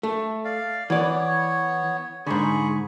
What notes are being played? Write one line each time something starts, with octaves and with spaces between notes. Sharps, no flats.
A3
D5 F5
E3 B3 C#5 D5
G#2 D3 G#4 B5 C#6